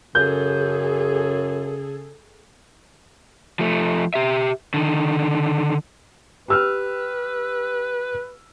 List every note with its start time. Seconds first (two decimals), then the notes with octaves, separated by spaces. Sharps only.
0.15 F#2 C#3 G#4 A4 G6
3.59 F3 A3
4.14 G4 E5
4.74 D3 D#3
6.48 G4 B4 E6 F6